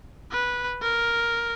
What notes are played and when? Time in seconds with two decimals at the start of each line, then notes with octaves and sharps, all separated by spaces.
0.32 B4
0.82 A#4